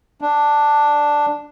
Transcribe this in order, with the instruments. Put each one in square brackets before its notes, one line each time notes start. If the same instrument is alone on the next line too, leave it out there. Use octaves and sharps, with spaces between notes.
[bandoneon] D4